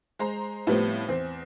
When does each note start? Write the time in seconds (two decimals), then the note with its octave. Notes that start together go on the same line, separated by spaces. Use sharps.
0.19 G#3 C5 A#5
0.67 A2 F3 G3 B3 C4
1.08 E2 C4